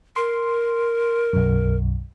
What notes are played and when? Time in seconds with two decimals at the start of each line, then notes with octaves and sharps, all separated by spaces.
0.16 A#4 C6
1.33 B1 F#2